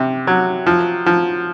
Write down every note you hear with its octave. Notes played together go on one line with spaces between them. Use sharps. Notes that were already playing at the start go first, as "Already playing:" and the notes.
Already playing: C3
F#3
F3
F3